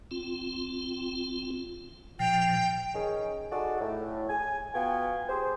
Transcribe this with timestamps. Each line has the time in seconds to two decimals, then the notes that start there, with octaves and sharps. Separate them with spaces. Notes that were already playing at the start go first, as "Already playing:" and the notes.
0.11 C4 F4
2.19 A#2 F3 G5
2.95 D#3 C#4 D#4 G#4
3.52 D#4 F#4 G#4 A4 D5
3.80 A2
4.29 G#5
4.75 B3 F4 F#4 G5 G#5
5.29 G4 G#4 C5